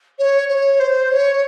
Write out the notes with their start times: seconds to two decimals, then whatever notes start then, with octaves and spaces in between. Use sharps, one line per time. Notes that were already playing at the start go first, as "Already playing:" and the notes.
0.18 C#5
0.48 C#5
0.79 C5
1.10 C#5